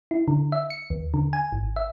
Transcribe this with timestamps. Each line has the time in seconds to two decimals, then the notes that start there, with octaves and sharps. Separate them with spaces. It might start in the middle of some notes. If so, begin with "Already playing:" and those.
0.11 E4
0.28 D3
0.52 E5
0.70 C#7
0.90 D#2
1.14 D3
1.33 G#5
1.52 G#1
1.76 E5